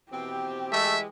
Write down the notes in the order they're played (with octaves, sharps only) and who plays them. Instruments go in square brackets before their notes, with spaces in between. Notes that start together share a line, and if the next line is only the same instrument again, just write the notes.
[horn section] B2 E3 C4 [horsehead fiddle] G4
[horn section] E3 G#3 [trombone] A3 [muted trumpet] E5